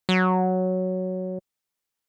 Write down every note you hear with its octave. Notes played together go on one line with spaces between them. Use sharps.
F#3